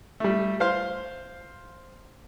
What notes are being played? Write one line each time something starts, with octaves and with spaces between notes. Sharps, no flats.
G3 A3
C5 F5 C6